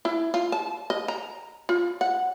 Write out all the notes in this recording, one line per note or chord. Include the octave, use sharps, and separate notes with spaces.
E4
F4
A5
D#5
A#5
F4
F#5